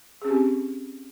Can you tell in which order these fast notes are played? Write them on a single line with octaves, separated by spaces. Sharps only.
G#4 C#4 G4 C4